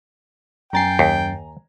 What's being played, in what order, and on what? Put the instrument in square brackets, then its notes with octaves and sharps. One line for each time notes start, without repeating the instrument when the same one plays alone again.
[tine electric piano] F#2 A6 C7 [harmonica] G5 [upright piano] G#5 A#5
[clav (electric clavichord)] D#2